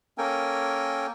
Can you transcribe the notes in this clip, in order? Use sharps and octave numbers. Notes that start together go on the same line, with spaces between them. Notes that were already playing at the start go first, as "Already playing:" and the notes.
A#3 C#4 A4 A#4 G5 G#5